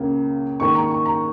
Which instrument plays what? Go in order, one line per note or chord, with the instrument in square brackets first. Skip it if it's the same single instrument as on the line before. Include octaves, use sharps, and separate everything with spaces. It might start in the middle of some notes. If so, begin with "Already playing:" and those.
Already playing: [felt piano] C#2 C#3 A#3
G#2 D#3 A#3 C#6
A#5
C#6
A#5